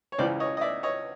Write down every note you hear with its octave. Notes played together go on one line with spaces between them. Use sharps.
C#5
C#2 C#3 E3 C5 D5
C#5 D#5
D#5
D5 E5
C#5 D#5